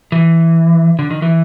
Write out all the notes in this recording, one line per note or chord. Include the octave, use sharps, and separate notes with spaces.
E3
D3
D#3
E3